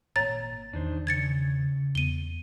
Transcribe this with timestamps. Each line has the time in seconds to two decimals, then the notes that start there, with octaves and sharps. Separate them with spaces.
0.16 G#1 A#2 C#5 A#5 A6
0.73 E2 D#3 D4 D#4 C5
1.07 C#3 G#6 A6 C#7
1.95 E2 B3 D#7 G7